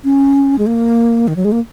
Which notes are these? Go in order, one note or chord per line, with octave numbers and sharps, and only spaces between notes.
C#4
G#3
A#3
D#3
F#3
G#3
A#3